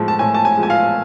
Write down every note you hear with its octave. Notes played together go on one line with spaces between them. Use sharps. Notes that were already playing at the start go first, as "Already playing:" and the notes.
Already playing: A2 F3 G#3
A5
A2 G#5
A5
G#5
F3 G#3
G#5
F5